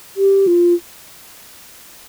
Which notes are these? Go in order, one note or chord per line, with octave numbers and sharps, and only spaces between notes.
G4
F4